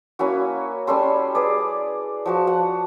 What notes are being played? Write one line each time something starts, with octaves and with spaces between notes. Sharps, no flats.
A#3 C#4 E4 F#4
G3 C#4 A4 C6
G#4 B4 D5
F3 F#4 A5
F#5